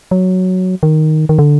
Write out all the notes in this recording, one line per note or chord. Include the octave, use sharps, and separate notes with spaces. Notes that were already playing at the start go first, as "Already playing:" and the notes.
F#3
D#3
D#3
D3